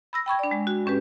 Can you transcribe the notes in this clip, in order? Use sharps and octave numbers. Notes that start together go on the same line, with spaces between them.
B5 E6 A#6
G5 B5 C#6 G#6
D4 D5
G#3
F#4
A2 C#4 G4 B4